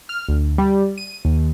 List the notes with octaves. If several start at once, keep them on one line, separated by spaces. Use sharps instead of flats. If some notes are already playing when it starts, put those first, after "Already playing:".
F6
D2
G3
D#7
D#2